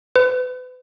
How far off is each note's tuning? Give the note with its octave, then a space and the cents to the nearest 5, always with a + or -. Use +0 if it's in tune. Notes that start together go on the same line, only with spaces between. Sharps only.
B4 +35